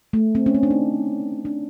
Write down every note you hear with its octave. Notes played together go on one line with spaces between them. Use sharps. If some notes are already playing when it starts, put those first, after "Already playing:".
A3
C4
C#4
C4
D4
D#4
D4